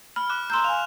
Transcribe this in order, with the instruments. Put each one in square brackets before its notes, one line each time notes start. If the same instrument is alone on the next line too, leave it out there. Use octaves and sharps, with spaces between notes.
[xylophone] B5 [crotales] F6
[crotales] D6 F#6
[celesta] A#5 E6 E7 [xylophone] C6 G6
[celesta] F5 G#5 [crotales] F7